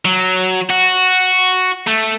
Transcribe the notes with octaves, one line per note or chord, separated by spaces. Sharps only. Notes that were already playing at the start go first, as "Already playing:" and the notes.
F#3
F#4
A3